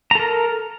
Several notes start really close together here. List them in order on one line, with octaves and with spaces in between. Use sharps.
A#5 A4 A#4